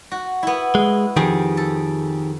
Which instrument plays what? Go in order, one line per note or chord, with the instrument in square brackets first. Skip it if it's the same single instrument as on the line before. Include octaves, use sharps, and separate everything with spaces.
[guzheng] F#4
B3 E4
[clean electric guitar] G#3
[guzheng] F2 [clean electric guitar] D#3 G4 G#4
[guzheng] A4